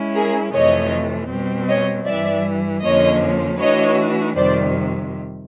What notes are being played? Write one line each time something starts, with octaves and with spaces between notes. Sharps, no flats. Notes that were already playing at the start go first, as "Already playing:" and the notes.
Already playing: G#3 C#4 E4
G#4 A#4
F2 C3 E3 A3 C#5 D#5
B2 G3 C4
C#5 D#5
G2 E3 G3 D5 E5
F2 D3 F3 A#3 C#4 C#5 D#5
E3 A3 D4 F#4 B4 C#5 D#5
F2 C3 D#3 G3 C5 D5